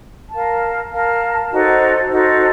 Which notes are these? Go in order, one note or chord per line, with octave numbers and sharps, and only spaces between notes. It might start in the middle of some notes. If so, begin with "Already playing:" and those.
A#4 F5 A5
A#4 F5 A5
D#4 F#4 A4 C5
D#4 F#4 A4 C5